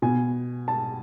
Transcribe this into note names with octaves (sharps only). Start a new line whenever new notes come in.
B2 G#5
A5